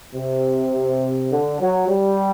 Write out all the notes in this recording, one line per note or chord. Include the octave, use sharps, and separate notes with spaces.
C3
D3
F#3
G3